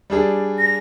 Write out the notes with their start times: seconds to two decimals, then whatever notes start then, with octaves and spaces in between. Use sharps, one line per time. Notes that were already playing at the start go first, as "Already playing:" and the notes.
0.10 G3 D4 G#4
0.59 A#6